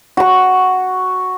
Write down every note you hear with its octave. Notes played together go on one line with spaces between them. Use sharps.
F#4 C#6